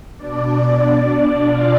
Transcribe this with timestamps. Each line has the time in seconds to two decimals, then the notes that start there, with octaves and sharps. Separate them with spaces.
0.16 B2 D4 D5
1.46 F4 F5